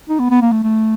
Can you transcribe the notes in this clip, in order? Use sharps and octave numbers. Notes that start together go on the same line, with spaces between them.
D#4
B3
B3
A#3
A3
A3